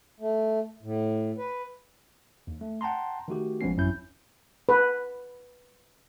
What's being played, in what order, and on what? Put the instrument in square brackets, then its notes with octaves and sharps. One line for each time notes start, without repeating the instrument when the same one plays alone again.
[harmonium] A3
A2
B4
[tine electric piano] D#2
A3
F#5 G5 A5 A#5 C6
D#3 A3 F#4 G4
A1 F3 G#3 B3 C#4 C7
A1 F#2 F#3 C#4 E4 G6
[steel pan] B4